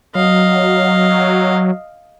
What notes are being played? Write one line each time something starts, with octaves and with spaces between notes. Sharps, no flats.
F#3 D#5 F5